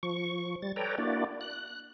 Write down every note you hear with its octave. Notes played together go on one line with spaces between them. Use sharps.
F3 C#6
G3 A6
A4 B4 C#5 D5 G5 A#5
A#3 D4 E4 F#4 D5
F#6